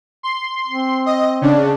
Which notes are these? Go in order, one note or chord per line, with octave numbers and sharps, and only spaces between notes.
C6
C4
D#5
C#3 D4